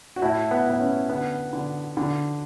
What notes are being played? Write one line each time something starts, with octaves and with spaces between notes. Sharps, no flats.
F#4
A2 E4
B3
A2 B3
C#4
D3 B3
D3
D3